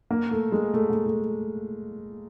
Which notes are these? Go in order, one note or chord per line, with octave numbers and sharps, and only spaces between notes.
A#3
A3
G#3
A3
A#3
A3